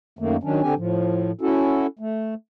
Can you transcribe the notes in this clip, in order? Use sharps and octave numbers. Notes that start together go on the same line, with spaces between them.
F#2 D#3 A3 A#3
D#3 F#3 C#4 D4
D3 C4 D4 G4 G#5
A2 F3
C#4 E4 F#4 A4
A3